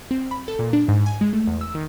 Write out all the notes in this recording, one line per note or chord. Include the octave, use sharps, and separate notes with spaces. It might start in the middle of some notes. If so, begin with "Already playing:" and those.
C4
B5
A4
A#2
D4
G#2
G#5
G#3
A3
E2
E6
D#3